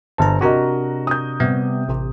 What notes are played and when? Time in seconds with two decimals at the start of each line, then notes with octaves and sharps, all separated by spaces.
0.18 G1 C5 A5 A#5
0.41 C3 D4 F#4 A#4 D#5 A#5
1.07 D#6 G6
1.40 C3 G3 B3
1.89 A1 C3